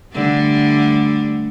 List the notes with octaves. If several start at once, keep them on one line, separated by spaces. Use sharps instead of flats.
D3 G3 A3